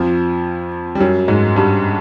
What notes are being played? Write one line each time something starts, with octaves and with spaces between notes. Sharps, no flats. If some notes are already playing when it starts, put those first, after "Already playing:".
Already playing: F2 F3
G3
F#2 F#3
G#2 G#3
G2 G3